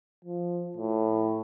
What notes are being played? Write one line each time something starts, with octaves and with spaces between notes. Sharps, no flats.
F3
A2